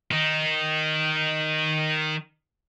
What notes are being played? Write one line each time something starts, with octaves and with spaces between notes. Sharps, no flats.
D#3 D#4